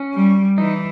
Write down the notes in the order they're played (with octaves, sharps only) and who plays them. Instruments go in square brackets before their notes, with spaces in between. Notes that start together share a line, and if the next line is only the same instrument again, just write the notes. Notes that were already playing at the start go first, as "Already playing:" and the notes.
Already playing: [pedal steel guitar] C#4
[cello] G3
[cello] E3 [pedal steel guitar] D#4